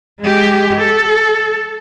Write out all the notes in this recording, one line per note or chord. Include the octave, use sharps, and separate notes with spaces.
G#3 G4
A4